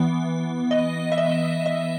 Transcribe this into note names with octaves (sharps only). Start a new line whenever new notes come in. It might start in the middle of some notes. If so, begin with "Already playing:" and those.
Already playing: E3 B3
D#5
E5
D#5
E5